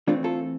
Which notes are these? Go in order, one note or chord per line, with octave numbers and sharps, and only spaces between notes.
E3 A3 C4 D4 F4
F4 A4